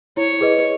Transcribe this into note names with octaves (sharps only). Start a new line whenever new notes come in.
E4 C#5
G#4 B4 D#5